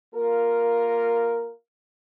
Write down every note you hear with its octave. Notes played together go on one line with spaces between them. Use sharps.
A#3 F4 A#4